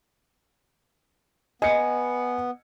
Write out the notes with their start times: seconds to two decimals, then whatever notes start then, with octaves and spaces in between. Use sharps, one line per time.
1.62 B3 D#5 G#5 C#7